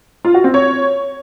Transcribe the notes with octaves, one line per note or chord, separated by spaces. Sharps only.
F4
F#4
C4
C#5